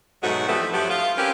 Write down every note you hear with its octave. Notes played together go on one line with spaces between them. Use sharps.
G#2 B2 F#3 G#3 A3 F#4
E3 F3 G3 A3 B3 C4
G2 F3 F#3 A3 B3 G4
F4
C4 C#4 F4 G4 A#4 B4